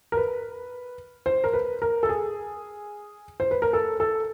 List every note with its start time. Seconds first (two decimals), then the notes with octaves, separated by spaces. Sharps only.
0.12 A#4
0.17 B4
1.26 C5
1.44 A#4
1.53 B4
1.82 A#4
2.03 A4
2.09 G#4
3.40 C5
3.51 B4
3.62 A#4
3.73 A4
4.00 A4